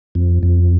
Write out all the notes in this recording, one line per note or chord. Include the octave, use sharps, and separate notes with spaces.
F2
F2